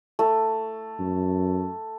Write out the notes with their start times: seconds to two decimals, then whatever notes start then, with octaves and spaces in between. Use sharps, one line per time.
0.19 A3
0.99 F#2